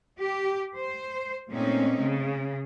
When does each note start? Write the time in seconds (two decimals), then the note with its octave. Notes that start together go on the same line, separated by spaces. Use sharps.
0.20 G4
0.77 C5
1.50 A#2 A3 C4 C#4 D#4
2.00 C#3